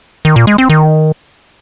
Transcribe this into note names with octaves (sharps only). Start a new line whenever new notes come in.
D#3
A#2
G#3
C4
D#3